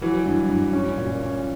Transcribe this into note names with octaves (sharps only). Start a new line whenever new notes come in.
E3 F#3
G2
G2
C#4
A#2
C#4